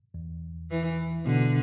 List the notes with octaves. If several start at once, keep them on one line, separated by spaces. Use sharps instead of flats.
E2
E3
B2 D3